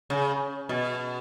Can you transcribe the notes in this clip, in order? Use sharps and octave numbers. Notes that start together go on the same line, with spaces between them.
C#3
B2